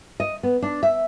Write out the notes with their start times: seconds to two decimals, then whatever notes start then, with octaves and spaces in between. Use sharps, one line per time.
0.20 D#5
0.43 B3
0.62 D4
0.83 E5